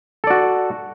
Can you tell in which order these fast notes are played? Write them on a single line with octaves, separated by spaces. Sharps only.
A4 D5 F#4